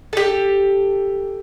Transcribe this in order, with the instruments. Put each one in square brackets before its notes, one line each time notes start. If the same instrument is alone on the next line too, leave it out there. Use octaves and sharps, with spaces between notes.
[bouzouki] G4 A4